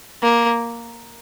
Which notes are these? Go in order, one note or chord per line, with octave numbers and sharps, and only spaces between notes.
A#3